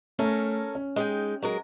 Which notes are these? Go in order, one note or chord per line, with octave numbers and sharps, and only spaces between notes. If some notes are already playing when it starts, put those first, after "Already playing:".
A3 C#4 A4 A#4
C#4
G#3 D#4 G5
F#3 G#3 A#4